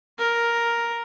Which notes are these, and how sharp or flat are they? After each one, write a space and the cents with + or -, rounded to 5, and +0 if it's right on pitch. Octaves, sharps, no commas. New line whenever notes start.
A#4 +5